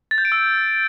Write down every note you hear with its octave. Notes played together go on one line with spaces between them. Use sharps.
A6
G6
D7
E6